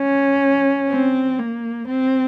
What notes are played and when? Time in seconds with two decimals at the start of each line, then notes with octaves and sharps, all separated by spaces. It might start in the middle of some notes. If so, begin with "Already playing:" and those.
Already playing: C#4
0.89 C4
1.39 A#3
1.88 C4